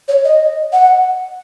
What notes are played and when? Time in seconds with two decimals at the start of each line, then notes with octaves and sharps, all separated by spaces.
0.08 C#5
0.25 D#5
0.73 F#5